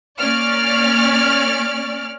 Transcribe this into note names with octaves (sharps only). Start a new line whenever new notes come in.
A#3 C#4 D5 F6